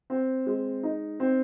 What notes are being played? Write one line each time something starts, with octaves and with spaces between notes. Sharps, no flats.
C4
G#3
D#4
C4